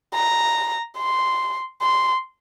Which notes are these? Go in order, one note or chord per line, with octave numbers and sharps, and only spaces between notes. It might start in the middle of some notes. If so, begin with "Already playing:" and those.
A#5
C6
C6